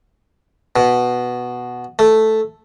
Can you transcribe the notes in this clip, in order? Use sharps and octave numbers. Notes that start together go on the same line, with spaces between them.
B2
A3